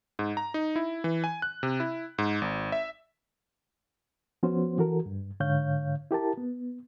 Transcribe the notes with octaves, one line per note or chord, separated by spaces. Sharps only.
G#2
A#5
D#4
E4
E3
G#5
F#6
C3
E4
G#2
G#1
E5
F3 B3 C#4 F#4 C5
E3 F#4 A4 A#4
G2
G#2 D3 C#5 F5 G6
E4 G4 A#4 A5
B3